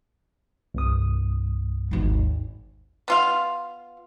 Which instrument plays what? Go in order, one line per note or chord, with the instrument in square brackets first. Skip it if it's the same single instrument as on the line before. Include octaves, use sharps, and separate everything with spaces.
[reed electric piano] C2 G2 D#6
[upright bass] G#1 D#2
[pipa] B3 F4 F5